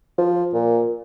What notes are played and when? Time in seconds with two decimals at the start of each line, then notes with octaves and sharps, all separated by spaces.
0.18 F3
0.54 A#2